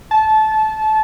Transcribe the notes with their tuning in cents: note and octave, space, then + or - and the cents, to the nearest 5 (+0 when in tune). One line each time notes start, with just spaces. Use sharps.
A5 -20